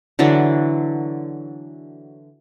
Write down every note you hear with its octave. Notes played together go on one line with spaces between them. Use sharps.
D3 E3 F#3 D4